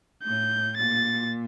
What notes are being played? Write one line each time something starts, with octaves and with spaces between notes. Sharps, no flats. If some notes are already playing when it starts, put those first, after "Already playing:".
A2 G6
A#2 A6